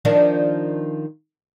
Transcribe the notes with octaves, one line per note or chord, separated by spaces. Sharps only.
D#3 F3 D4